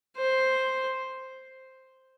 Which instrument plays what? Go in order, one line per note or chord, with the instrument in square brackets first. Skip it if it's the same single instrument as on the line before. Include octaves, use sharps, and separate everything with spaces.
[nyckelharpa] C5